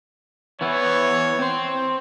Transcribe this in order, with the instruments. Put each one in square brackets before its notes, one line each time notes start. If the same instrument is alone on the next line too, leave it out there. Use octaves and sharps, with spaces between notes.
[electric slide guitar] E3 B3 E4 [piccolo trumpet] C#5
[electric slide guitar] C4 C5